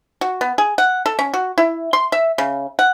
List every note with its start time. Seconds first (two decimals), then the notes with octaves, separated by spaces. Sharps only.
0.21 F#4
0.41 B3
0.58 G#4
0.78 F#5
1.06 A4
1.19 C#4
1.34 F#4
1.58 E4
1.93 C6
2.12 E5
2.38 C#3
2.79 F#5